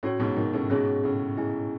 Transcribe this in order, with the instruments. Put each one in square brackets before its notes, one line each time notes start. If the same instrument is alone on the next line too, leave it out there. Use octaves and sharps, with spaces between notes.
[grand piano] A2 [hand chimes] C#4 F#4 C#5
[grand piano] G#2 B2
B2 D#3
A2 C#3
[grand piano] G#2 B2 [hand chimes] C#4 G#4 C#5
[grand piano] A2 C#3
[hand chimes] A3 E4 G#4 D#5 G#5